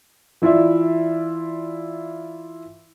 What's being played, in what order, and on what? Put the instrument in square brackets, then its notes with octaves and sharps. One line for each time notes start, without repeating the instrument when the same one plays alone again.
[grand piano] E3 E4 F4 D5 E5